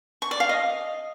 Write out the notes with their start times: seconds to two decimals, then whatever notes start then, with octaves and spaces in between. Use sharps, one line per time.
0.22 C#6
0.31 D5
0.40 F5
0.49 D#5